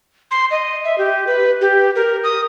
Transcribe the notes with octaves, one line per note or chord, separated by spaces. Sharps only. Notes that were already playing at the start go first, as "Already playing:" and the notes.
C6
D#5
E5
G4
B4
G4
A#4
D#6